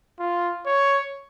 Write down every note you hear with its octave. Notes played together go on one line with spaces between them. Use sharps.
F4
C#5